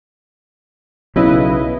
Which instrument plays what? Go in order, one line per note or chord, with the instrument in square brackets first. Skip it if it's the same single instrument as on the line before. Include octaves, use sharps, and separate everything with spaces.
[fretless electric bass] B1 C#3 [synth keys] E4 B4 D#5